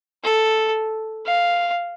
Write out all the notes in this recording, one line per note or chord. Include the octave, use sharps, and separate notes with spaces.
A4
F5